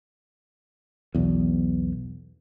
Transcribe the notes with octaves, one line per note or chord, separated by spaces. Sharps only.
B1 E2